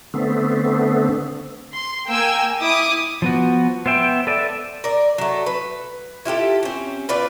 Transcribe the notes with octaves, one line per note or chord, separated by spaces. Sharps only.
D3 A3 B3 C4
C6
A#3 G5 G#5 E6
E4 D6 D#6
F3 B3 F#4
B3 C5 E5 G5
A4 B4 D5 E5
A#4 D5
F#3 A3
B4
E4 F4 G4 A4
C4 C#4
B3 F4 B4 D5